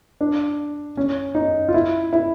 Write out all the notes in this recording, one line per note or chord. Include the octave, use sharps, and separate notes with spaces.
D4
C#4
D#4
F4
E4
E4